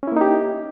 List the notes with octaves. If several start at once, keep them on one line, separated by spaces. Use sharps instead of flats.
A#3 C#4 D#4 E4 G4